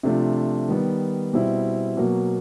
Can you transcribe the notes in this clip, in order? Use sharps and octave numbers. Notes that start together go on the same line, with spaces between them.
C3 F3 A3 D4 F4
D#3 G3 B3
B2 G3 C4 E4
B2 F#3 A#3